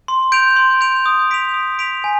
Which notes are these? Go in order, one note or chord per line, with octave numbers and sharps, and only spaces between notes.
C6
G6 D7 F7
C6
G6 D7 F7
D#6
B6 D7 F7
D#6
B6 D7 F7
G#5